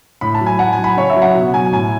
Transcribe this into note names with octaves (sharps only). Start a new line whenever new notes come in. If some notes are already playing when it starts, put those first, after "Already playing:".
A2 B5
A5
F#3
G#5
A2 F#5
G#5
F#3
B5
C#3 C#5
E5
F#3
F#5
B2
F#3 G#5
A2 G#5